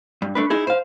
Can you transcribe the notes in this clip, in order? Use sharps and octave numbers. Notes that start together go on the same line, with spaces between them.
G2
A3 D4 B4
D#4 E4 G#4
C5 F5